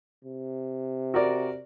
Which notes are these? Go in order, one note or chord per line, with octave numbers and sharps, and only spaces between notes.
C3
F#4 A#4 D5